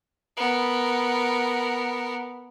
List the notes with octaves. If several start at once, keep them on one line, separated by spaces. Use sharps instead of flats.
B3 A#4